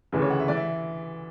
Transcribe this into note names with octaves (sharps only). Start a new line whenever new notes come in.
D2 C#3 E3 B4
C#5
F#5
E5
E3 D5
E5